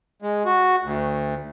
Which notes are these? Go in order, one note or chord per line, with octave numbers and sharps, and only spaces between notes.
G#3
F#4
D2